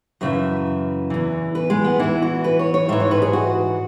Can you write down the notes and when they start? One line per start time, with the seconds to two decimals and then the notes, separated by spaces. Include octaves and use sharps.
0.21 F#2 C#3 E3 E5
1.10 E2 E3
1.55 B4
1.70 G#3
1.84 B3
1.99 E2 E3 E4
2.22 F#4
2.44 B4
2.59 C#5
2.74 C#5
2.89 G#2 E3 E5
3.00 C#5
3.11 B4
3.22 G#4
3.33 F#4